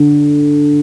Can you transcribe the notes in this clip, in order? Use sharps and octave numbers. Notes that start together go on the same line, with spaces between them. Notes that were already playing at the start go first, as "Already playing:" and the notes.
Already playing: D3